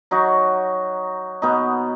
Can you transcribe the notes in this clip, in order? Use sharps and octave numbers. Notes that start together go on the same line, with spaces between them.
F#3 D#4 F#4
B2 B3 D#4